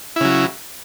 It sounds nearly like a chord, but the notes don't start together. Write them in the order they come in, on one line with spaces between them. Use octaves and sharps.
E4 C#3 F#3